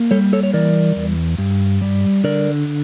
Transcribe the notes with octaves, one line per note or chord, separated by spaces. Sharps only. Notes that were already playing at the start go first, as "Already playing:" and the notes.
Already playing: A#3
G3 A4 C#5
A4 C#5
C#5
E3 A#4 D5
E2
G2
G3
D3 A#4 D5